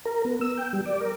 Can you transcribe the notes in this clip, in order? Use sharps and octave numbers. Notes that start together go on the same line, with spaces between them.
A#4
B3
E6
G5
G3
D5
A#4